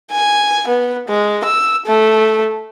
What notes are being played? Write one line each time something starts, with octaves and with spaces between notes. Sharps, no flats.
G#5
B3
G#3
E6
A3